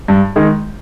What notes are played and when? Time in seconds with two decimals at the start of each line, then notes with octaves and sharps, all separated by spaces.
0.08 G2
0.36 D#3 G#3 D#4